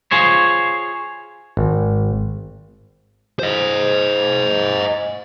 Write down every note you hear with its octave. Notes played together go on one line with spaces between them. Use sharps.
F4 G#4 C5 C#5
G#1
C5 D#5